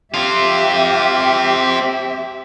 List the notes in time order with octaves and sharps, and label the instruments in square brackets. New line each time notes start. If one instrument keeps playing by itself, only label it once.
[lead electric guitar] C4 F4 [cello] G4 E5